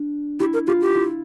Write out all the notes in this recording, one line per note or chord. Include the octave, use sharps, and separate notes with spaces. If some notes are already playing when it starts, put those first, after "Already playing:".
Already playing: D4
E4 G4
A#4
F4 G4
G4
E4